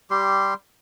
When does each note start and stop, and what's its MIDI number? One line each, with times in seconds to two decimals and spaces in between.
0.11 0.54 55
0.11 0.54 67
0.11 0.54 84